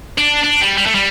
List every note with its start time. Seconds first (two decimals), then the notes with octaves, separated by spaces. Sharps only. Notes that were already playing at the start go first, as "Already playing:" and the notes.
0.18 D4
0.44 D4
0.61 G3
0.77 G3
0.86 A3
0.95 G3